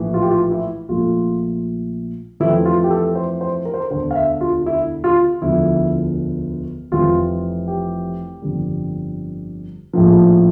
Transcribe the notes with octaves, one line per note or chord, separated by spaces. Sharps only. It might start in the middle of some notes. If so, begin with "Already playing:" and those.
Already playing: A#1 A2 E3
F4
G4
F4
E4
A#1 A#2 A3 F4
F2 E3 A3 C4 E4
F4
G4
A4
C5
C5
A#4
C5
A#4
E1 D2 D3 C5
F5
E5
F4
E4
F4
E1 D2 D3 F3 E4
F1 F2 E3 F4
G4
G1 F2 D3 G3
A#1 A2 F3